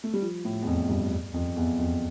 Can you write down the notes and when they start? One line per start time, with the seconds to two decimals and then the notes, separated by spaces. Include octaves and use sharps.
0.04 A3
0.14 G3
0.22 F3
0.45 A2
0.62 E2
0.67 F2
0.89 G2
1.34 F2
1.57 E2
1.79 F2